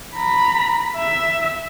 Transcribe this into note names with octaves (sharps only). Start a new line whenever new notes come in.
A#5 B5
E5